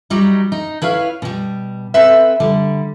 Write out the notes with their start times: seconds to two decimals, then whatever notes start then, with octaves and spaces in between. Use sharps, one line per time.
0.10 F#3 G3 D#4
0.52 D#4
0.82 E4 B4 C#5 F5
1.22 B2 G3
1.94 C4 A4 B4 E5
2.40 D3 G3